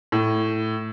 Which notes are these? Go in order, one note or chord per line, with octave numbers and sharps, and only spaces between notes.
A2